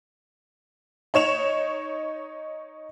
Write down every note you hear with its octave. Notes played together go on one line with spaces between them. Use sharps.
D#4 C#5 E7 F7